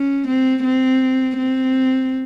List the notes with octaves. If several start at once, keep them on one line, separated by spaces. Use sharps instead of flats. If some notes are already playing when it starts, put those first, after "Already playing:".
Already playing: C#4
C4
C4
C4